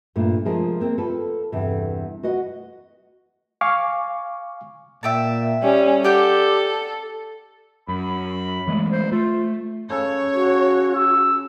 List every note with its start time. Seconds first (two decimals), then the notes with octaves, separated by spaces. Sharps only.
0.16 G2 A#2 A3 A#4
0.45 C3 F3 G#3 G#4 A#4 C5
0.80 A#3 C4
0.98 F4 G4 A4 B4
1.52 E2 G2 C3
2.23 F#4 B4 D#5 F#5
3.61 F5 G#5 C#6 D6
5.03 A#2 E5 G5 A5
5.63 G3 C#4
6.04 G4 A4 D5 F#5 G6
7.88 F#2 B5
8.67 E3 G#3 A3
8.91 C5
9.12 A3 F4
9.90 C#3 A4 C#5
10.34 F#4
10.95 E6